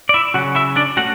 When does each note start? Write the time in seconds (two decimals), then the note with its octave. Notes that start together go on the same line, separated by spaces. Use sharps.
0.09 D5
0.14 E4 E5
0.34 C#3 F#3 C#4 F#4 F#5
0.55 E4 E5
0.76 D4 D5
0.97 A3 C#4 F#4 F#5